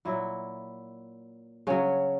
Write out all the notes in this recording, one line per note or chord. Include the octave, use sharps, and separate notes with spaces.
A#2 F#3 E4
C#3 F#3 C#4